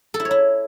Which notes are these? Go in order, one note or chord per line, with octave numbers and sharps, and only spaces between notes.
A4
E4
C#5
E4